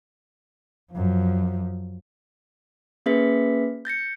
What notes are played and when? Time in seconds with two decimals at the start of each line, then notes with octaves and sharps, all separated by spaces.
0.92 F#2 F3
3.06 A#3 C#4 G#4 B4 E5 B6
3.85 G6 A6 A#6 C#7